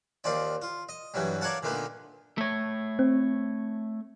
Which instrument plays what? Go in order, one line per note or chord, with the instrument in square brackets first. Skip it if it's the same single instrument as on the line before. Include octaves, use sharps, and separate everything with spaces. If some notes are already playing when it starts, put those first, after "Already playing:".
[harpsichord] D#2 C4 F4 D5
F4
D#5
G2 E3 F#3 G3
A#4 C#5 D5 F5 F#5 A5
A#2 D3 A3 B3 D#4
[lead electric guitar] A3 C#5
[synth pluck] C4